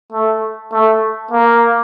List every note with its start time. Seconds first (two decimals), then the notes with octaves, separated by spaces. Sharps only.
0.12 A3
0.73 A3
1.31 A#3